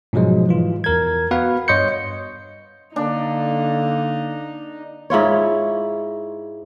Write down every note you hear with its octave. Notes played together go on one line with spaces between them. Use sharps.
G#2 B2 F3 F#3 G#3
E3 F4
E2 A#4 G#6
B3 F#4 B4 F5
G2 C#5 D#5 C6 G6 C#7
D3 A#3 D4 D#4
G#2 E4 F4 C#5